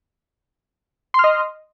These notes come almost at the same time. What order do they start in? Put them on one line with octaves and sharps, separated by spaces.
C6 F6 D#5